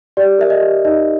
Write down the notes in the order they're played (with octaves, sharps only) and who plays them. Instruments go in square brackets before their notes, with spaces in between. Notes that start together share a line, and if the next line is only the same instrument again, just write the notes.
[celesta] G4 D5
A#4 E5
D#5
G4
D#4 D#5